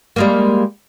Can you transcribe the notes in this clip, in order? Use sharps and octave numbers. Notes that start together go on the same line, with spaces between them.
G3 G#3 A#3